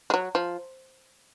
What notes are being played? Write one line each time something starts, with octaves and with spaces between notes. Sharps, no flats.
G#3
F#3
F3